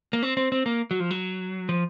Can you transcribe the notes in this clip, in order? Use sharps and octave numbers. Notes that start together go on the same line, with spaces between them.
A#3
C4
C4
C4
A#3
F#3
F3
F#3
F3